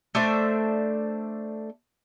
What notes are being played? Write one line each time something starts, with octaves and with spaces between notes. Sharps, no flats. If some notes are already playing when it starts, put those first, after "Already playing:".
A3 D4 C5 E5